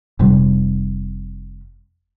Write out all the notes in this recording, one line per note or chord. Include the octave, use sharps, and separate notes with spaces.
F1 C3 G3